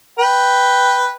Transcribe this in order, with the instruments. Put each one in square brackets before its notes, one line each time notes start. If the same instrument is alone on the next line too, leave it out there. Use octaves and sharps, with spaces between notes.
[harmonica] B4 G5